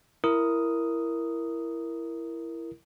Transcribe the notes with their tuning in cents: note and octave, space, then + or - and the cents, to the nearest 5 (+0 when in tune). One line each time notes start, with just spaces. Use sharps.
E4 +15 A#4 +0 D#6 +0